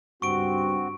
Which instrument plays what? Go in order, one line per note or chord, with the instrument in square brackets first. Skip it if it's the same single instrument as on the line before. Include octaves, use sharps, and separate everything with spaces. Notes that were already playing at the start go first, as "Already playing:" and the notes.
[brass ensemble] C#2 G2 [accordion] C4 F#4 [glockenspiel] C#6 D7